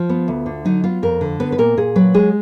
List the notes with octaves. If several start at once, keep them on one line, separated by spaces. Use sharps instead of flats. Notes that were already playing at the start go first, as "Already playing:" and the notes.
Already playing: F3 F4
B3
D2
D3
F#3 D#4
B3 F4
F2 A#4
D3
B3 B4
B4
A#2 A#4
A#2 G#4
F#3 B4
G#3 G#4